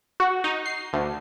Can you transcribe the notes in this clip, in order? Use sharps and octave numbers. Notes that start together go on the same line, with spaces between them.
F#4
D#4
C7
D2